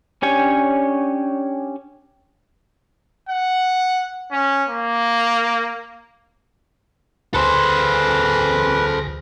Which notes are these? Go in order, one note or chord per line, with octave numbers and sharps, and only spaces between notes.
C#4 D4 G4 C#5 G#5
F#5
C#4
A#3
D2 G#4 A4 B4 C5 A#6